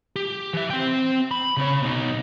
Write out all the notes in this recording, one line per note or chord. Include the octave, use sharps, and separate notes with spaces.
G4
E3 E5
C4 G5
B5
C#3 C#5
B2 D#4